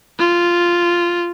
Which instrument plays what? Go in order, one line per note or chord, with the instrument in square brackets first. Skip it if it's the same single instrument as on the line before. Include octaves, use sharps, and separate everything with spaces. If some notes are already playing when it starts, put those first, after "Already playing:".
[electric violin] F4